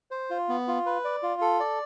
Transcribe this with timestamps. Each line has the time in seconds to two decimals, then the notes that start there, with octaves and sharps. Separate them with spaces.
0.11 C5
0.30 F4
0.49 B3
0.68 F4
0.86 B4
1.05 D5
1.23 F4
1.41 A4
1.60 D5